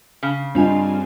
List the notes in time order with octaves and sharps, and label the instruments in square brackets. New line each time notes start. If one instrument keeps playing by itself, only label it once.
[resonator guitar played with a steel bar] C#3
[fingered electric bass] G2 G3 [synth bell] C4 F4 G#5 [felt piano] D4 D#5